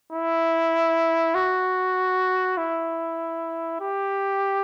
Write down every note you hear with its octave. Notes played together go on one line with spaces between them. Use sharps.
E4
F#4
E4
G4